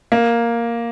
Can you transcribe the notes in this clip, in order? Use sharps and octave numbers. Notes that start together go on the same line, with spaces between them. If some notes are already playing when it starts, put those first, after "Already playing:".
A#3